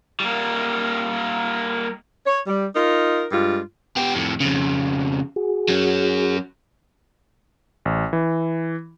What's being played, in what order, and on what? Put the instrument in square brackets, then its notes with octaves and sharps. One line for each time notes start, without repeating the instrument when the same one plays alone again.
[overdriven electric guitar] G3 A#3
[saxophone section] C#5
G3
D#4 F4 A#4
G2 G#3 F4
[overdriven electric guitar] B3 G4
F2 A2
F2 C#3
[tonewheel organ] F#4 G#4
[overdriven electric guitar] F#3 C#4
[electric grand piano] A1
E3